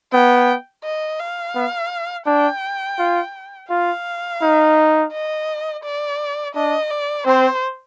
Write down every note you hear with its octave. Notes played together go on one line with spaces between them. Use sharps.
B3 G5
D#5
F5
B3
D4 G5
F4
F4 F5
D#4
D#5
D5
D4 D#5
D5
C4 C5